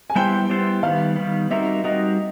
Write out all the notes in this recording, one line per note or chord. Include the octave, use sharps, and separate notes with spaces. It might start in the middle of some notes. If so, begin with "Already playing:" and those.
G#5
G3 B3 E4 G4 C5 G5
G3 B3 E4 G4 C5
D#3 G3 B3 F5
D#3 G3 B3
G3 C4 D#4 F#4 A#4 E5
G3 C4 D#4 F#4 A#4 D#5